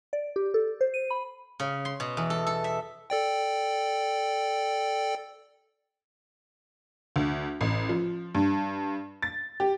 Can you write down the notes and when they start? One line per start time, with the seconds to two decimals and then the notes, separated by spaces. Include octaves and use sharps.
0.13 D5
0.36 G4
0.54 A4
0.81 C5
0.94 D#7
1.10 B5
1.60 C#3
1.85 C6
2.00 B2
2.17 E2
2.30 A4
2.47 A4
2.64 E5
3.10 A4 D5 G5
7.16 D2
7.61 A1
7.89 F3
8.35 G2
9.22 A6
9.60 G4